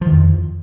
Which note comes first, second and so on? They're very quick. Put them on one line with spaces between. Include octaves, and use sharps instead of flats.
F3 D#3 F2